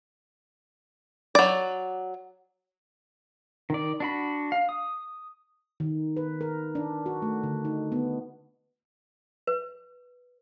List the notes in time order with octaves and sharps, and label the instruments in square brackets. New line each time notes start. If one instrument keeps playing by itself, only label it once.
[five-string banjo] F#3 D5
[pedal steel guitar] D#3 D5
D4 F#4 B5
F5
D#6
[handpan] D#3
B4
A#4
D4
F#4
A3
D3
D#4
B3
[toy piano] B4